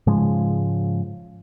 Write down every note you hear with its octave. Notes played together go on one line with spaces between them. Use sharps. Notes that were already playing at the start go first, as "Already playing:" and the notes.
G#2 C#3 F3 G#3